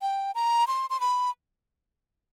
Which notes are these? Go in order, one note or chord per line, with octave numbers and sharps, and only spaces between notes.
G5
A#5
C6
C6
B5